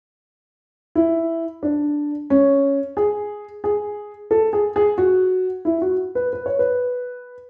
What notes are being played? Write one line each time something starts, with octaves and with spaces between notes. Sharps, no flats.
E4
D4
C#4
G#4
G#4
A4
G#4
G#4
F#4
E4
F#4
B4
B4
C#5
B4